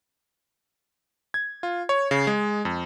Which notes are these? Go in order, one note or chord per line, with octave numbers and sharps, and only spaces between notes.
G#6
F4
C#5
C#3
G#3
F2